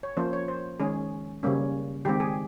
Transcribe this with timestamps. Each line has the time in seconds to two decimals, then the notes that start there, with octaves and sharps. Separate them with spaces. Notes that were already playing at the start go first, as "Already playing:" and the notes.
0.03 C#5
0.17 F3 A#3 C#4 C5
0.33 C#5
0.48 C5
0.80 D#3 G#3 C#4 G#4
1.43 C#3 G3 A#3 C#4
2.05 D#3 G#3 C4 G4
2.20 G#4